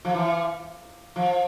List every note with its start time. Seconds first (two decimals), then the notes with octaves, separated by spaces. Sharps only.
0.05 F3
0.14 E3
1.16 F3